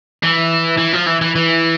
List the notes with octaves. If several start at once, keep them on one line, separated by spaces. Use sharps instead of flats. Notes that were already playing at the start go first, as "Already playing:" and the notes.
E3
E3
F3
E3
E3
E3